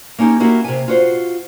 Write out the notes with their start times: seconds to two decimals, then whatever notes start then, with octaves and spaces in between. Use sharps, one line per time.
0.19 A#3 C#4 D#4 G4
0.40 A#3 E4 F#4 G4
0.64 C3 G#5
0.88 F4 F#4 C5